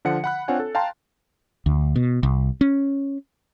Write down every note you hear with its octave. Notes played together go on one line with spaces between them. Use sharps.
D3 F3 F#5 C#7
F#5 B5 F#6
C4 D4 F4 C#5 F#5 G#5
A4
F5 G5 A5 A#5 C6
D2
B2
C2
C#4